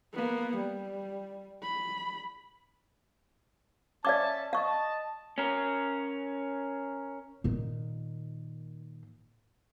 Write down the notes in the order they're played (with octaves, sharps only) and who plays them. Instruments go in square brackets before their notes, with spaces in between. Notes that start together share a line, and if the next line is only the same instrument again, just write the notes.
[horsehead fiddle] A#3 B3
G3
B5
[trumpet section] C#4 E5 A5 [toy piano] D5 F5 D6
[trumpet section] D#5 A5 [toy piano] F5 C#6
[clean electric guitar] C#4 A#4
[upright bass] A#2 D#3